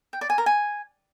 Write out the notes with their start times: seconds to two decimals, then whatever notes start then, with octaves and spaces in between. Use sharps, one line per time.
0.13 G5
0.21 D5
0.30 G#5
0.38 A#4
0.46 G#5